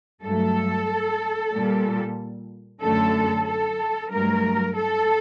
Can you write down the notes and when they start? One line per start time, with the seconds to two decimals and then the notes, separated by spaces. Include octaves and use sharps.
0.22 G2 F#3 A3 A4
1.52 A#2 G3
2.81 F#2 D3 F#3 A3 A4
3.46 A4
4.11 G2 F#3 A3 A#4
4.76 A4